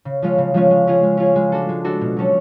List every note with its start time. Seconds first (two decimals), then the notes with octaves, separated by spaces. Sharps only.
0.05 C#3
0.22 F3 G#3 C#4 F4
0.38 C#3
0.54 F3 G#3 C#4 F4
0.70 G#3
0.87 C#4 F4 G#4
1.03 G#3
1.17 C#4 F4 G#4
1.36 G#3
1.52 D4 F#4 A4
1.69 G#3
1.85 D4 F#4 A4
2.01 B2
2.17 F#3 C#4 F#4 A4